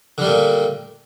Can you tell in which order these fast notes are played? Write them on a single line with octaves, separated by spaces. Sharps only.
D3 G3 A3 A#2